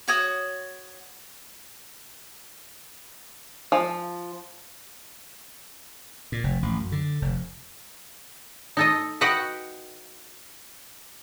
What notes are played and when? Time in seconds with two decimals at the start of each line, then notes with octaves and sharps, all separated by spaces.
0.08 F#4 C#5 D#6
3.72 F3
6.32 A#2
6.44 F1
6.62 A1
6.77 F#2
6.92 D3
7.22 F1
8.77 D#4 A4 D#5
9.21 F#4 B4 D#5 F#5 G5